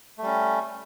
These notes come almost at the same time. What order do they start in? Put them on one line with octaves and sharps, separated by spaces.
A3 G3 C#4